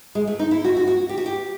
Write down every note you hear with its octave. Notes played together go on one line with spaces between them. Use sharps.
G#3
A3
D#4
E4
F#4
F#4
F#4
G4
F#4
G4